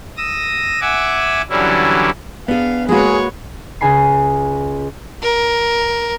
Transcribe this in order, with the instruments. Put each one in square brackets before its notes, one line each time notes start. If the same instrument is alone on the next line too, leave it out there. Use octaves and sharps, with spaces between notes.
[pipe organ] D#6 E6 A#6
E5 F#5 G#5 D6 E6
D3 E3 F#3 G3 C#4 E4
[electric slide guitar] B3 [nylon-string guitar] D4 G#4 [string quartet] F5
[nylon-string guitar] G#3 A#3 F#4 [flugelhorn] G#4 [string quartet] B4 C#5
[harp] C#2 G#5 B5 C7
[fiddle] A#4